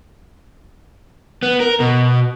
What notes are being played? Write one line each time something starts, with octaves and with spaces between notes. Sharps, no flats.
B3
A#4
B2